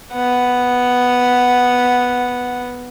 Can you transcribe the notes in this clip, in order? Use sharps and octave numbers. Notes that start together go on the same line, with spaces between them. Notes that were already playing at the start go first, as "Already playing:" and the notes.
B3 F#5